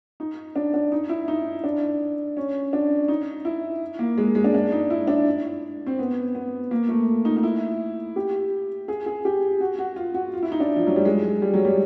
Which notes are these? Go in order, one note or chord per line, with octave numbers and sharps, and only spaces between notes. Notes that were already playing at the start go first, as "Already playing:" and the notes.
D#4
D4
D4
D#4
E4
D#4
D4
C#4
D4
D#4
E4
A#3
G#3
G#3
D4
D4
D#4
E4
D4
C4
B3
B3
A#3
A3
D#4
D#4
E4
G4
G#4
G#4
G4
F#4
F#4
F4
F#4
F4
E4
D#4
D4
F3
F#3
G3
G#3
G3
F#3
G3